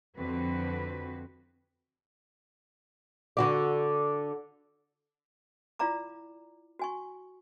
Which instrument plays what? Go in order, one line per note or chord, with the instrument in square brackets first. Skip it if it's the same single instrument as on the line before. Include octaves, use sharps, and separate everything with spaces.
[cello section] F2 D3 C4 F#4 B4
[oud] D3 F#4 D5
[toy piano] E4 F4 D5 F5 A#5 D6
F#4 G#5 C#6